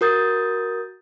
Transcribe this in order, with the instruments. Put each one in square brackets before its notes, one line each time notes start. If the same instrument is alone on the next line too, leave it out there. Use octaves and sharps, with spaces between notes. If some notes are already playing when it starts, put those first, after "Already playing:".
[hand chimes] F#4 A#4 D#6 G6 A6